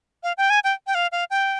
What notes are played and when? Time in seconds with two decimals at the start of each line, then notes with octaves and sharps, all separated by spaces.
0.23 F5
0.38 G5
0.50 G#5
0.64 G5
0.87 G5
0.95 F5
1.12 F5
1.31 G5